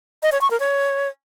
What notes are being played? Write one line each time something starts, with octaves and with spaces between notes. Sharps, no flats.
D#5
C#5
C#6
A#4
C#5